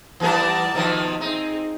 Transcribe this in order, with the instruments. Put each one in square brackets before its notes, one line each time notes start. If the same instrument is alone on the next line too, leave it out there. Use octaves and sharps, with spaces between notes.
[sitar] E3 B3 A#4 [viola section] G3 D5 A5
[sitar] B2 D#3 F3
[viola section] C4 G#4 [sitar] D#4